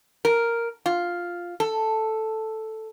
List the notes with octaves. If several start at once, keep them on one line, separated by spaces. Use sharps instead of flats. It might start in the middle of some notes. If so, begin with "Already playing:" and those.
A#4
F4
A4